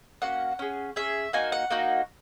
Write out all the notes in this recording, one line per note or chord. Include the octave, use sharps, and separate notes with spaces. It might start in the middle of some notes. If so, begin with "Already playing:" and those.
A#3 C#4 F#4 F#5
C#4 G#4
C#4 G#4 E5
A#3 D#4 F#4 G#5
F#5
A#3 D#4 F#4